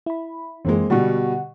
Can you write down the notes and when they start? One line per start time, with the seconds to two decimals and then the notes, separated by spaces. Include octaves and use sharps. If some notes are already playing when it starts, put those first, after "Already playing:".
0.06 E4 B5
0.65 F#2 E3 G#3 A#3 C4
0.90 B2 D3 G3 F#5 C#6